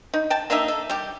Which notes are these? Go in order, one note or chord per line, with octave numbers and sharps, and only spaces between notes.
D#4
G5 A5
A#3 D4 D#4 E5
A4
G3 G4